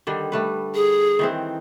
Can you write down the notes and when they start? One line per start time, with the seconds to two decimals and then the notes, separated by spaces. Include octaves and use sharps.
0.07 D3 D#3 G3
0.32 G3 A3 B4
0.75 G#4
1.19 D#3 E3 C4